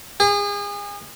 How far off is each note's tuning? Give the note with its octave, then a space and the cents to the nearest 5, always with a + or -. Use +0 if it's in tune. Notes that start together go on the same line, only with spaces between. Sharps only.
G#4 -35